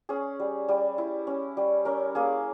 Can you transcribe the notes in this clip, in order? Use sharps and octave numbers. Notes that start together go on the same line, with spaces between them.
C#4 G#4
G3
G3
E4
C#4
G3
C#4 A#4
A#3 G#4